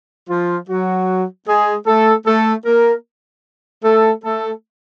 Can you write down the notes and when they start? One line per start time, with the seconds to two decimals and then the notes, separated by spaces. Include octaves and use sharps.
0.28 F3 F4
0.68 F#3 F#4
1.47 G#3 G#4
1.86 A3 A4
2.25 A3 A4
2.65 A#3 A#4
3.83 A3 A4
4.23 A3 A4